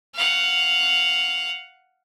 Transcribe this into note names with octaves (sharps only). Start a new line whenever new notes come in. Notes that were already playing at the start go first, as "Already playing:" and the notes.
F5 F#5